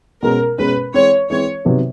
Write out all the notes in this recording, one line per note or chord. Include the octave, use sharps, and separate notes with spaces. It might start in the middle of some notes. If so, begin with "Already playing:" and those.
B2 G#3 C#4 A#4
B2 G#3 C#4 B4
E3 G#3 C4 C#5
E3 G#3 C4 C#5
C3 D#3 F#3 B3